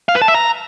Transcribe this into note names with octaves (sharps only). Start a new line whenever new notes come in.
F5
B4
A5
E5
A#5